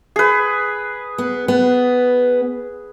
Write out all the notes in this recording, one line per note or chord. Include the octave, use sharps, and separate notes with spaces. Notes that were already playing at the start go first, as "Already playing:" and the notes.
G#4 B4
B3
B3